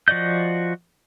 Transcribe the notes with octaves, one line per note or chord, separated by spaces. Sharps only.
F3 F#4 D5 D#5 G6